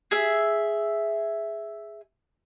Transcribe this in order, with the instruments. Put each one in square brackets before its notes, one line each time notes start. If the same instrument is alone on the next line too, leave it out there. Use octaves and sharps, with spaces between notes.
[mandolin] G#4 E5